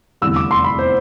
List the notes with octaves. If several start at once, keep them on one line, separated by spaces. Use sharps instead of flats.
F1 E2 D3 G3 E6
D6
C6
B5
C5